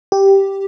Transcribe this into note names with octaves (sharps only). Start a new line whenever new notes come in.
G4